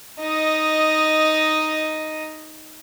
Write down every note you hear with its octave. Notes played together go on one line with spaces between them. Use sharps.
D#4 D#5